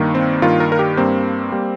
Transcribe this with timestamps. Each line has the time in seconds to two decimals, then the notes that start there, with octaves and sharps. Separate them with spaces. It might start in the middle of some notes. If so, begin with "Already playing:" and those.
Already playing: G2 D#3 A#3
0.15 C4
0.42 G2 D#3 A#3 F4
0.60 A#4
0.72 A#4
0.79 G4
0.97 G2 G3 A#3 C4
1.52 G3 A#3